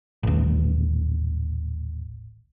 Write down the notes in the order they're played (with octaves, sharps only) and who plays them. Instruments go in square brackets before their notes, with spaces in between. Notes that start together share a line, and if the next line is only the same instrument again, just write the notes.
[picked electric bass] D#1 A1